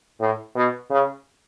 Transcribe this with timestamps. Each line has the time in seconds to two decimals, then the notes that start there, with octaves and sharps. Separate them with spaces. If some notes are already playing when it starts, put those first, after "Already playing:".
0.20 A2
0.55 B2
0.90 C#3